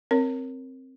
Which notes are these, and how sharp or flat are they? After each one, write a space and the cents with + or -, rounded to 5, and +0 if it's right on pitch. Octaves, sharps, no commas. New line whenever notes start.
C4 +5 A#4 +0 C#5 +0